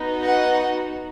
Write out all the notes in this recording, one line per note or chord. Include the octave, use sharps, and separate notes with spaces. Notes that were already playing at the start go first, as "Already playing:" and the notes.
Already playing: B3 D#4 F#4
D#5 F#5